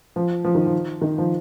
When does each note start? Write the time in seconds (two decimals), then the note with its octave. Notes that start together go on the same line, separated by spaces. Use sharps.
0.16 F3
0.44 F3
0.55 D#3
0.66 F3
1.01 D#3
1.18 F3